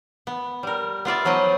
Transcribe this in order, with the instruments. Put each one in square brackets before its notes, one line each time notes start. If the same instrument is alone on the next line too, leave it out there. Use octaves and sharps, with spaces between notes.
[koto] B3
G3 A#4
B3 F4 D5 E5
F3 F#3 B3 D#4 D#5 G5